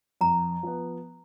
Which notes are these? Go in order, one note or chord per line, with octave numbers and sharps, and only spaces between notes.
F2 A#5
F3 B3